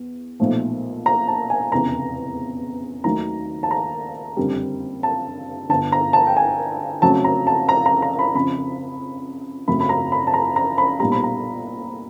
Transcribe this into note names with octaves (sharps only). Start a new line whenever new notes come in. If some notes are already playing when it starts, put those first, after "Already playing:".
Already playing: E2
B1 A#2 F3 A3
A#5
A5
G#5
F1 E2 C#3 A#5
D#2 D#3 F#3 A3 A#5
A5
A#5
F#1 F2 D3 G3
A5
G1 G2 D3 A5
A#5
A5
G5
G#5
F#1 F2 C#3 F#3 A3 A5
A#5
A5
A#5
A#5
A#5
B5
F2 C#3 F3 B5
G#1 F#2 C#3 F#3 A3 B5
B5
A#5
B5
A5
A#5
A#5
B5
B1 A#2 G3 A#5
B5
A#5